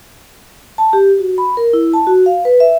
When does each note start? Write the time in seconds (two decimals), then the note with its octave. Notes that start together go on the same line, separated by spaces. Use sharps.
0.78 A5
0.93 G4
1.19 F#4
1.38 B5
1.57 A#4
1.73 E4
1.93 A5
2.07 F#4
2.26 F5
2.45 B4
2.60 E5